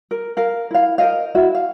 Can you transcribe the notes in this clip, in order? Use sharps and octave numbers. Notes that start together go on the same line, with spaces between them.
A#4
A#4 F5
E4 F5
A#4 C5 D#5 F5
E4 F#4 E5
F5